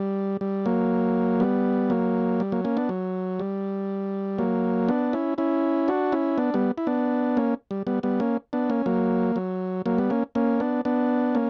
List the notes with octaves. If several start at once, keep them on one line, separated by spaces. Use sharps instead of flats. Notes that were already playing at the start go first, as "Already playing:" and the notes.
Already playing: G3
G3
F#3 A#3
G3 B3
F#3 A#3
G3
F#3 A#3
A#3 C#4
B3 D4
F#3
G3
F#3 A#3
B3 D4
C#4 E4
C#4 E4
D4 F#4
C#4 E4
B3 D4
G3 B3
E4
B3 D4
A#3 C#4
G3
G3 B3
G3 B3
A#3 C#4
B3 D4
A#3 C#4
F#3 A#3
F#3
F#3 A#3
G3 B3
A#3 C#4
A#3 C#4
B3 D4
B3 D4
A#3 C#4